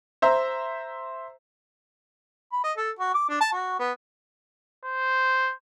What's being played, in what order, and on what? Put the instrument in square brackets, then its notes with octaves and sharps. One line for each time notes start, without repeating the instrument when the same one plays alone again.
[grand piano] C5 E5 A#5
[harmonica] B5
D#5
A4
F#4
D6
D4
A5
F#4
B3
[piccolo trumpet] C5